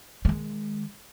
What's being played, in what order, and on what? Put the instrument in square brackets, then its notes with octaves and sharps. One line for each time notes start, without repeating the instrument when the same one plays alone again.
[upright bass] D#3 G#3